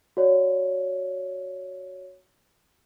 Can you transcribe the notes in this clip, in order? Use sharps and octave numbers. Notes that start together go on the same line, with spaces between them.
F#4 C#5 D5